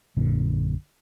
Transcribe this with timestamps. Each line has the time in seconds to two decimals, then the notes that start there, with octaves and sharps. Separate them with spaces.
0.17 A#1 F#2 A#2 D3